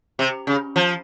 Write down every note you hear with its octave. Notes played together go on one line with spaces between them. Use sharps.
C3
C#3
F3